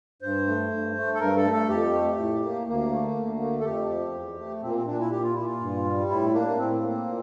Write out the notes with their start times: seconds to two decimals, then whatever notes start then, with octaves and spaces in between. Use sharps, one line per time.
0.22 G2 C5
0.47 A3
0.71 G2
0.96 A3
1.15 A4
1.20 G2 A#4
1.36 A4
1.44 A3
1.53 A4
1.69 F2 G4
1.93 A3
2.18 A2
2.43 A#3
2.67 D2 A#3
2.91 A3
3.16 D2
3.40 A3
3.60 A4
3.65 F2 G4
3.89 F3
4.13 E2
4.38 A3
4.62 A#2 C4
4.69 A#3
4.75 C4
4.87 A#2 D4
4.99 E4
5.11 A#2 G4
5.23 F4
5.34 A#2 E4
5.46 F4
5.60 G2
5.84 G3
6.09 A2 E4
6.33 A#3 D4
6.47 A#3
6.58 A2 C4
6.82 A#3
7.06 A#2